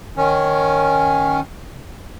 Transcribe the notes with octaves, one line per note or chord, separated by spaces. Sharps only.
D#3 C#4